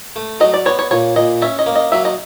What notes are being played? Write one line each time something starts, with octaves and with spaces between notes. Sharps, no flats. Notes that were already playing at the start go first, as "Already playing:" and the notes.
A3
F#3 D#5
D5
B3 C#5
C#5
A#2 C#5
A#2 D#5
C#4 E5
D#5
A#3
D#5
F#3 E5
D#5